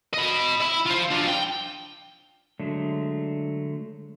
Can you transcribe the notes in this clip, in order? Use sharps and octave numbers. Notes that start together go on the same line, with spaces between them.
D#5 B5
E5 B5
F4 C5
D4 F4
G5
D3 F#3 G#3 A3 D4